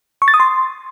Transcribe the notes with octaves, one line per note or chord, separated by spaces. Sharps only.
C#6
A6
D#6
C6